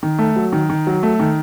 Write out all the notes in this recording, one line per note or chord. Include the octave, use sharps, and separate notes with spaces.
D#3
A3
F#3
D#3
D#3
F#3
A3
D#3